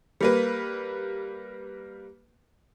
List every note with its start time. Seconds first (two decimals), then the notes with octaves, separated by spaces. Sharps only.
0.21 G3 A#3 B4